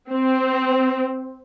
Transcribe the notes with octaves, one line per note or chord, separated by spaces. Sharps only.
C4